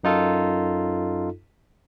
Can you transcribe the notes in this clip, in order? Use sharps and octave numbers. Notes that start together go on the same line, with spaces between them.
F#2 D#4 F4 A4